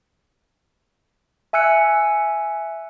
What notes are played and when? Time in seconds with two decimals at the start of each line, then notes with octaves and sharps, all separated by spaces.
1.53 E5 G#5 E6 F#6 C#7